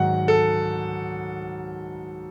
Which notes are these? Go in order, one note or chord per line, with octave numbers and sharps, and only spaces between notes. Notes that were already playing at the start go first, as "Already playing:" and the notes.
Already playing: G#2 D#3 F#3 F#5
A4